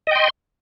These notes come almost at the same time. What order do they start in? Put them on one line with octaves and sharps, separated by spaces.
D#5 G5 C6